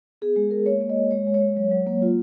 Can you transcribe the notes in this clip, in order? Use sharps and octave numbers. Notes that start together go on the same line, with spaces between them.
B3 G#4
G#3 G#4
G#3 A#4
A#3 C#5
A#3
D#5
A#3
G#3 C#5
G#3
C#5
G#3
F#3
F#3
A#3
F4